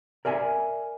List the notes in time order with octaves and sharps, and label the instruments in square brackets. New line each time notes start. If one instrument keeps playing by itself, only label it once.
[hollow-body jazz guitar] A#4 D5 E5 G#5